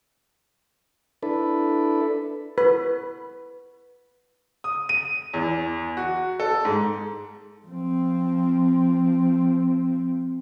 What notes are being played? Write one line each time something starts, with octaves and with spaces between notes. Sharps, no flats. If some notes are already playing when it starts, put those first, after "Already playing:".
D4 E4 A4 B4
B4
D#6
D#7
E2
F#4
A4
G#2
F3 C4